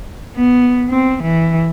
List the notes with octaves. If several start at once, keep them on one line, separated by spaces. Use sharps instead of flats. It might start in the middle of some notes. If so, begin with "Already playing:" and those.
B3
C4
E3